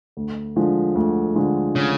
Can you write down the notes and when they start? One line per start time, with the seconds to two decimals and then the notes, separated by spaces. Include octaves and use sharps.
0.17 D2
0.56 D3 F3 G#3
0.95 D2
1.35 D3 F3 G#3
1.76 C#3